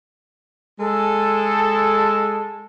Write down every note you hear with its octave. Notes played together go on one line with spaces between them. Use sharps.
G#3 A4